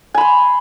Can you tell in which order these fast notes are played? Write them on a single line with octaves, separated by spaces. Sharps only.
G#5 B5 C6